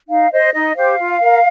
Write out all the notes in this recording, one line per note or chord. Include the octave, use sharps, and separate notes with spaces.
D#4 F5
C5 D#5
D#4 D#5
G4 C5 F5
F4
A#4